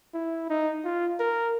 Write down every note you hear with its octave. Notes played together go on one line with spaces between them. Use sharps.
E4
D#4
F4
A#4